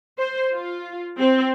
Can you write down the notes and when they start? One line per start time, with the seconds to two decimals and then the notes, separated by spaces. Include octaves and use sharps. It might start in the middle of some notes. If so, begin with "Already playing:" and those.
0.19 C5
0.53 F4
1.20 C4